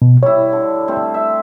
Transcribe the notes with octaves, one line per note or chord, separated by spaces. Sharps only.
B2
G3 E4 C#5
D3
G3 A3 C4
E5